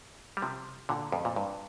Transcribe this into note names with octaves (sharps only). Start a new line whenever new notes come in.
G3
C3 F3
A#2 D3
F2
A#2
G2